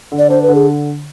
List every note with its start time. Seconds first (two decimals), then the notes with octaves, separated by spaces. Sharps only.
0.12 D3
0.18 D5
0.30 D4 C5
0.42 B4
0.49 D3
0.55 G#4